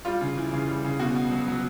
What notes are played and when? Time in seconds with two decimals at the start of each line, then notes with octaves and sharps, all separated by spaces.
0.05 G3 F4
0.21 C#3
0.37 E3
0.52 C#3
0.69 G3
0.84 C#3
0.99 B2 F#4
1.15 B2
1.31 F#3
1.48 F#3